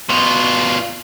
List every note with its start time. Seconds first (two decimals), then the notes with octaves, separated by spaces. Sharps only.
0.09 B2 F4